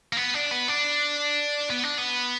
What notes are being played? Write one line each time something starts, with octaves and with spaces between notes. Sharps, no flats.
A#3
B3
D4
B3
D4
B3
D4
B3